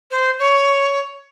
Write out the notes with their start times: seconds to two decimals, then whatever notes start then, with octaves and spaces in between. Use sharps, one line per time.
0.11 C5
0.39 C#5